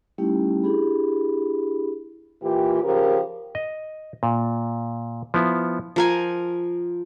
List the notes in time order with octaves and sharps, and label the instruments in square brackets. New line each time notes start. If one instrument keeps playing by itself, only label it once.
[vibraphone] G3 A3 C#4 D#4 E4 G4
D4 E4 G4 G#4 B5
[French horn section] A#2 E3 F4 G4
C#3 F3 G4 A#4
[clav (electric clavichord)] D#5
A#2
F3 B3 E4
[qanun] F3 A#4 G#5